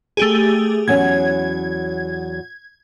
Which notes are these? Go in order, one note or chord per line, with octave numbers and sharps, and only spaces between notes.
A3 G4 G#4
E2 F#3 C#4 G#6